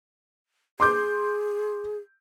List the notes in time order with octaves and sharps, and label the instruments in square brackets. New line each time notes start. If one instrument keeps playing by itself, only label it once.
[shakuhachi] G#4 [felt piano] C6 D6 G6